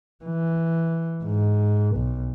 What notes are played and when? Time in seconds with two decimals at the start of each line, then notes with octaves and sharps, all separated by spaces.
0.24 E3
1.24 G#2
1.96 B1